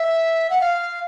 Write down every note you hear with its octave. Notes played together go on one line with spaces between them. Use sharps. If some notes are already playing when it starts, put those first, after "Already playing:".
Already playing: E5
F#5
F5